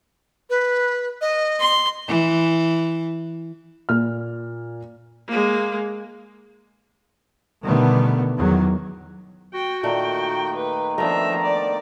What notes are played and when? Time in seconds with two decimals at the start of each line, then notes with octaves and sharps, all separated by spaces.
0.50 B4
1.21 D#5
1.60 C6
2.07 E3
3.89 A#2 F6
5.28 G#3 A#3
7.63 B2 D3 D#3 G3 A3 B3
8.36 E2 D#3 F#3
9.54 F#4 G5
9.83 A#2 D#3 A3 A#3 D#4 G5
10.56 B4
10.98 F3 A3 B3 D4 E5 A#5
11.42 D5